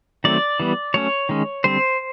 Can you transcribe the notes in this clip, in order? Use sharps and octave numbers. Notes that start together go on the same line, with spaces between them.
D#3 F#3 A3 C4 D5
E3 G3 B3
F#3 A3 C#4 C#5
D#3 G#3 C#4
D3 G3 C4 C5